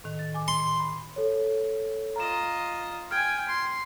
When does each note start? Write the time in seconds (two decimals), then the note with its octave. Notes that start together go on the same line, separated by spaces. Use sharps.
0.04 A2 D#3
0.19 A6
0.34 G#5 D6
0.48 C6
0.79 B5
1.16 A4 C#5
2.16 F4 D#5 A#5 E7
3.11 G5 G#5 F6 G#6
3.48 C6